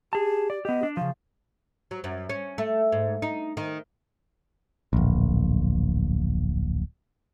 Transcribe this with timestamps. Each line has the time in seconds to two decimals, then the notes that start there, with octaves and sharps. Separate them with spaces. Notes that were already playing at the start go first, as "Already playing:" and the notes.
0.13 G4 G#4 A5
0.50 D5
0.65 B3 G4 D#5
0.83 D4
0.97 C#3 F3 F5
1.91 F#3
2.04 F#2
2.29 C#4
2.58 A3
2.92 G#2
3.22 D#4
3.57 D#3
4.93 D1 A#1